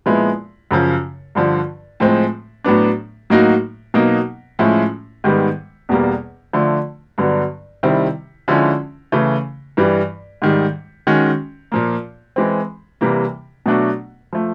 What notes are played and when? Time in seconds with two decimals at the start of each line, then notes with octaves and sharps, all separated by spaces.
0.06 A#2 F3 G#3 B3 E4
0.71 F#2 C#3 F3
1.35 G2 D3 F3
2.00 A2 F3 G#3 C4
2.64 A2 F#3 B3 D4
3.30 A2 F#3 A#3 D#4 F#4
3.94 B2 F#3 A#3 D#4
4.59 A2 F3 G#3 C#4 E4
5.24 G#2 D#3 G3 B3
5.89 E2 B2 G3 A#3
6.53 D3 F3 A3
7.18 G2 D3 F#3 B3
7.83 C3 D#3 G3 C4 E4
8.48 D3 F3 G#3 C#4 E4
9.12 C#3 E3 A3
9.77 G2 E3 G3
10.42 G#2 D#3 G3
11.07 D#3 G#3 C#4 F#4
11.72 A#2 F3 A#3
12.36 E3 G#3 C4
13.01 C3 E3 G3 A#3
13.66 B2 F#3 A3 D4 F#4
14.33 F3 A3